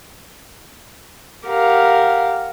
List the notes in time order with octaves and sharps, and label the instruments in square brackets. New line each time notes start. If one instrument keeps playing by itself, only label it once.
[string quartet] G4 A#4 F5 F#5